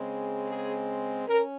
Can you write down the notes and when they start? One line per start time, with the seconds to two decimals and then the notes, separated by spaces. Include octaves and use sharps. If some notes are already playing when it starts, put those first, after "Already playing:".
Already playing: C#3 G#3 C4
0.47 G#4
1.28 C#4 A#4